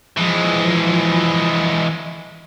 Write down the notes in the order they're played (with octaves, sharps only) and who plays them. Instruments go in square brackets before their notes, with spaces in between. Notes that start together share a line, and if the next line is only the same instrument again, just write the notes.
[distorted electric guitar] E3 G#3 [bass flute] F3